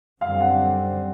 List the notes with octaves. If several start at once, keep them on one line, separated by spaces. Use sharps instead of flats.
F#2 D3 G3 C4 F5
F#5